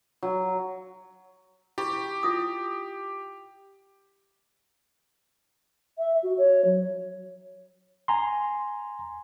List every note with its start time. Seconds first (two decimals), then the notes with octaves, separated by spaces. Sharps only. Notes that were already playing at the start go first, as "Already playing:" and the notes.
0.23 F#3
1.78 E4 G4 B5 C#6
2.23 E4 F4 D#6
5.98 E5
6.22 F#4
6.37 C#5
6.64 F#3
8.08 G#5 A#5 C6